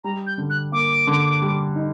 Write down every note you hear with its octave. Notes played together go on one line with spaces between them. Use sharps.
G3 A#5
G6
D3
F#6
A#3 D6
D3
G3
D#4